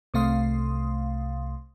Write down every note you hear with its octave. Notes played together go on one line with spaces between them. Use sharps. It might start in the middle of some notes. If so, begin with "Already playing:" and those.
C2 C3 A3 F5 C6 D#6